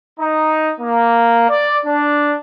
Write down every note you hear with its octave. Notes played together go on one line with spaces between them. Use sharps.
D#4
A#3
D5
D4